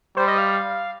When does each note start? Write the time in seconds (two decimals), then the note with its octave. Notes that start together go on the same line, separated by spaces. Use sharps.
0.17 G3 C5
0.28 D#5
0.38 F5